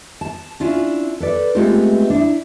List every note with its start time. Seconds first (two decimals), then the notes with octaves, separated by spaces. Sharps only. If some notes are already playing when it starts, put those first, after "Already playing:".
0.21 A5
0.60 C#4 D4 E4 F4
1.20 A4 B4 D5
1.55 G#3 A3 B3 C4 F4 G4
2.10 D4 E4